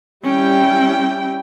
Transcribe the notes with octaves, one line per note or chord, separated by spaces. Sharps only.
G3 C#4 E4 G5